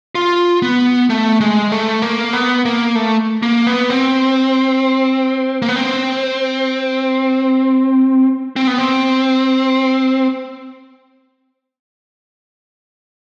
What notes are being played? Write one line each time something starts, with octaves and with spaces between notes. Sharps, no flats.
F4
B3
A3
G#3
A3
A#3
B3
A#3
A3
A#3
B3
C4
A#3
B3
C4
C4
B3
C4